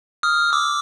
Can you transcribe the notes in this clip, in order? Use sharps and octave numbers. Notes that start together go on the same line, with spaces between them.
D#6 F6
D6 E6